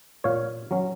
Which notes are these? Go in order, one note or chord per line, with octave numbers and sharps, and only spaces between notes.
A#2 C#5 F5
F#3 C#4